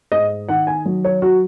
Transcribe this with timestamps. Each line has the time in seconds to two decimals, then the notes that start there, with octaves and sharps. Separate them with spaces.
0.12 G#2 D#5
0.49 D#3 F#5
0.67 G#5
0.85 F#3
1.04 C#5
1.22 F#4